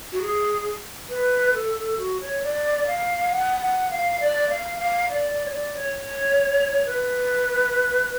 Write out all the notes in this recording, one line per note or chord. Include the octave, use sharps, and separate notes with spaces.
F#4
G#4
B4
A4
A4
F#4
C#5
D5
F5
F#5
F#5
F5
D5
F5
F5
D5
D5
C#5
D5
C#5
B4